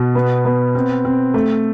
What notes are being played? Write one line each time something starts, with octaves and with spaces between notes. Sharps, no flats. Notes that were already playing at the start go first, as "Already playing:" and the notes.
Already playing: B2
B3
B3
C4
C4
A3